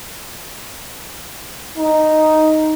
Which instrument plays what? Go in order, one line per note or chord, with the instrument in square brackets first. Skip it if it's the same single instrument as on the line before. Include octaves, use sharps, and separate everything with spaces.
[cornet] D#4